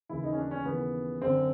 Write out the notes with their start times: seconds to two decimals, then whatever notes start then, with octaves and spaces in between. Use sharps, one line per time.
0.09 D#2 C#3 E3 E4
0.23 D#4
0.32 C#4
0.38 D4
0.51 C#4
0.65 D#2 C#3 E3 B3
1.21 F#2 D3 C4